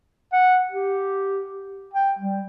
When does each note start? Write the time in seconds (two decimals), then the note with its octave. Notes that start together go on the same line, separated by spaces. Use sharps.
0.33 F#5
0.71 G4
1.94 G5
2.19 G3